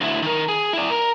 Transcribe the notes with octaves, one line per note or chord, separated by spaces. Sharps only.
D2 E4
D#3 A#4
G#4
E4 D5
A#4